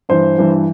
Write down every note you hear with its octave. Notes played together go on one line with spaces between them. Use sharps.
G2 E3 C5
G2 E3